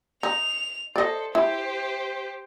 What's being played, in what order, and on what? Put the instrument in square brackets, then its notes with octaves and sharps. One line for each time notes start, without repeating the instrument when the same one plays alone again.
[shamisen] D#4 [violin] F7
[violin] A4 C5 [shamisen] D5 D#5
[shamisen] E4 [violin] G4 C5